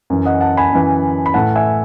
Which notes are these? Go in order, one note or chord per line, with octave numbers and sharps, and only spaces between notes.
F#2 E3
D#5 F#5
F#5 A5
G#5 B5
F#2 E3
B5
A2 E3 F#5 A5
E5 G#5